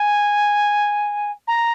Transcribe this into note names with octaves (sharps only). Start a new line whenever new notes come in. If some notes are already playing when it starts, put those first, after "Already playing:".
Already playing: G#5
A#5